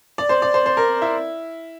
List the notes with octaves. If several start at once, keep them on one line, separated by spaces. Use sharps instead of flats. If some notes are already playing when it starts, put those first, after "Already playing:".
D5
C5
D5
C5
C5
A#4
E4